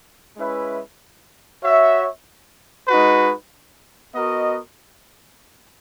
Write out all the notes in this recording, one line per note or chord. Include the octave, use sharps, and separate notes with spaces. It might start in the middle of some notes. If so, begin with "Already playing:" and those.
G#3 C#4 E4 B4 E5
F#4 C#5 E5
G#3 D#4 F#4 B4
B3 F#4 A#4 D#5